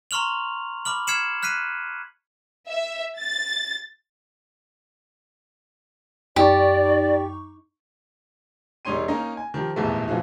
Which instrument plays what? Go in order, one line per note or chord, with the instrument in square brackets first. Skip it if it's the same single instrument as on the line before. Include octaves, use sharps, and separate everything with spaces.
[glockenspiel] A#5 C6 C#6 F6 F7 F#7
B5 D6 F6 F#7
F6 G#6 C7 C#7 E7 F#7
F6 F#6 B6 C7 D#7
[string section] E5
A6
[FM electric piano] F#2 D#4 C#6 [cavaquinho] G4 [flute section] D5
[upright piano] E1 G3 D#4 C#5 C6 D#7
A#3 C#4 D#4 D#5 A#5
G#5
D#3 F3 G4
D#1 B1 E2 G#2 A3
A#2 E3 F3 F4 F#4